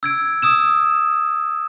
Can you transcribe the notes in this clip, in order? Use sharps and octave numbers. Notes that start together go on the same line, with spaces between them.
E6 G#6 D7
D#6 E6 E7